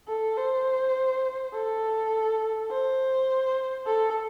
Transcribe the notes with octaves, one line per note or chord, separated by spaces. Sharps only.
A4
C5
A4
C5
A4